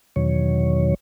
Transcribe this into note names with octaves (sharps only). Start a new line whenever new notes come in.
E2 B2 D#3 F#3 C#5